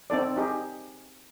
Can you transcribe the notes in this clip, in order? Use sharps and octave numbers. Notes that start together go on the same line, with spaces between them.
C4 D#4 A4 D5
D#4 G4 G#4